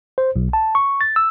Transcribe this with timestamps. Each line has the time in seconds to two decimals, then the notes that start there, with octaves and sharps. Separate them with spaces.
0.18 C5
0.36 B1
0.53 A5
0.75 C#6
1.01 A6
1.16 E6